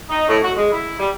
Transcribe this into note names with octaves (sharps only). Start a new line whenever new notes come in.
D#4
A2
F#4
G#3
E4
G3